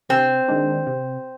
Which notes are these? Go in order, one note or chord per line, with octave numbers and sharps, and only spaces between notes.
C3 C4
D#3 G#3 D4
C3